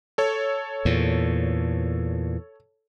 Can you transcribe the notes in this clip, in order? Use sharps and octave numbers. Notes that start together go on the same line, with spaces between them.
A4 C#5
E2 A#2